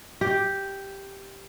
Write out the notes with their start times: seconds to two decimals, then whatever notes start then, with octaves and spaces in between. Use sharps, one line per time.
0.21 G4